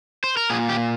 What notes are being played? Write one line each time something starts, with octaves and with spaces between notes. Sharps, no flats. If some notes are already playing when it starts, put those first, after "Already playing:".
C5
A#4
A#2 G#4
G4